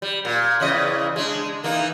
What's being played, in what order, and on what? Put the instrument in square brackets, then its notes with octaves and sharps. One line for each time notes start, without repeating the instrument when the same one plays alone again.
[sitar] G3
A#2
E2 C#3 D#5
G#3 D4
E3 A#3 D#4